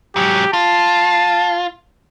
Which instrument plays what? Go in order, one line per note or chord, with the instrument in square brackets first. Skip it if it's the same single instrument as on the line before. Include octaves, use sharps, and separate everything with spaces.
[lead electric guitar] G#2 F#3 [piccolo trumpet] G4
[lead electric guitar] F4 [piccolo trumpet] A5